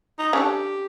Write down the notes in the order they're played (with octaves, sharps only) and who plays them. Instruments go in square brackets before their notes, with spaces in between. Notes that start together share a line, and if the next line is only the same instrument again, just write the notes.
[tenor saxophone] D#4
[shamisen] C#4 D4 A4 [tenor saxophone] G4